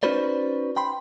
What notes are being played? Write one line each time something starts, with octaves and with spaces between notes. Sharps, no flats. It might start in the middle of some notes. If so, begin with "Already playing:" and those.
C#4 D#4 F#4 B4 C5 D5
G5 B5 C6